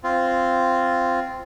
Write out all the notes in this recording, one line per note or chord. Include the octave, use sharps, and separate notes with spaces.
C4 F4